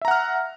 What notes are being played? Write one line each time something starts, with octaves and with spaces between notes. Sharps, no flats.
E5 F#5 A#5 F6